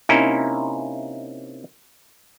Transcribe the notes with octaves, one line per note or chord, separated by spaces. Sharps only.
C3 A#3 C#4 D#4 E4